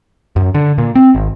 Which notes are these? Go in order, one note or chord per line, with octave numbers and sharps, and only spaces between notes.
F#2
D3
A#2
C4
G#1